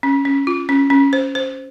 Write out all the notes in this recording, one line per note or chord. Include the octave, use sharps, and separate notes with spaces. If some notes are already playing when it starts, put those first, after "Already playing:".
C#4
C#4
F4
C#4
C#4
C5
C5